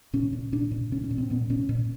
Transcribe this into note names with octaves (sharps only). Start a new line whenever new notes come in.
A#2 C#4
A#2
A#2 D4
A#2
A#2 C#4
C#4
A#2
C4
A#2 B3
A#2 C#4
A#2